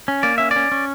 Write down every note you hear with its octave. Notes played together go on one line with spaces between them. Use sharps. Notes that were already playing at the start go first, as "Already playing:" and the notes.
C#4
A#3 D5
C#4 E5
D5
C#4
C#4